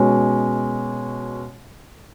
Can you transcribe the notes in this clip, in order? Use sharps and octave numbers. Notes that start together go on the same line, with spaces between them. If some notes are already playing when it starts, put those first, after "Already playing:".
Already playing: B2 G#3 C#4